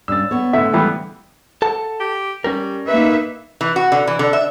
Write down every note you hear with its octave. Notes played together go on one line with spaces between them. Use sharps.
G2 C#4 E6 A6
B3 C#5
A2 D3 E5
E3 G3 B3 E5
A4 F#5 A5
G4
G3 C#4 G4 A#4
A#3 D#4 B4 E5
E3
F#4
D3
E3
D3
E5